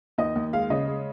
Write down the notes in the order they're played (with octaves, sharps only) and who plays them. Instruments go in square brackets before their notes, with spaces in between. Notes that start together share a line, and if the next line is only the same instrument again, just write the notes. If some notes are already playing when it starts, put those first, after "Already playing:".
[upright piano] D#2 D#5
D#2
G#3 F5
C#3 D#5
G#3